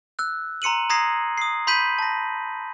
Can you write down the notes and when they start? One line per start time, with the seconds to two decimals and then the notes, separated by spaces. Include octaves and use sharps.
0.19 E6 F#6
0.62 A#5 C6 C#7 D#7 F#7
0.90 A#5 D#6 G#6 A#6 C7
1.38 D#6 C7
1.67 B5 C6 G6 B6 D#7 F#7
1.99 A5 A#6